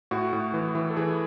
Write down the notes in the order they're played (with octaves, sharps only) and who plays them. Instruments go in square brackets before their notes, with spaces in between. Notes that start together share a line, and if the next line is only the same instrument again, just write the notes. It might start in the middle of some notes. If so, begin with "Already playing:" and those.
[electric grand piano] A2 F#4
A2
E3
E3
A4
E3 G#4